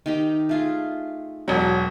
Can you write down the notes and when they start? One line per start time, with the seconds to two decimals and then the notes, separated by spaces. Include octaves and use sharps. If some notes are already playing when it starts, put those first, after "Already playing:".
0.06 D#3 D#4 G4
0.49 A3 F4 G#4
1.48 E1 F#3